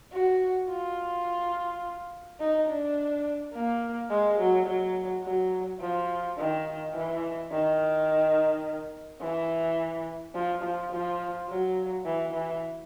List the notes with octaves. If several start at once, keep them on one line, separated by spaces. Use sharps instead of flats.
F#4
F4
D#4
D4
A#3
G#3
F#3
F#3
F#3
F3
D#3
E3
D#3
E3
F3
F3
F3
F#3
E3
E3